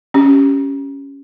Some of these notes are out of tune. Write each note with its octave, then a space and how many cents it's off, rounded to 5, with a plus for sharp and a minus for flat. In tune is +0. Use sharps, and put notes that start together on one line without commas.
C#4 +0 G4 +0